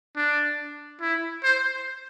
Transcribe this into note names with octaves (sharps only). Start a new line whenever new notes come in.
D4
E4
C5